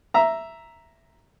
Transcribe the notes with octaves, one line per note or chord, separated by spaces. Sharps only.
E5 A#5